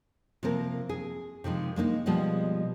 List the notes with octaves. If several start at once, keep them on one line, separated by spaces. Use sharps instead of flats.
C3 F3 A#3 C4 A#4
G#4
C3 D#3 F3 G#3
G#3 A#3 C#4 D#4
B2 F3 G3 G#3 B3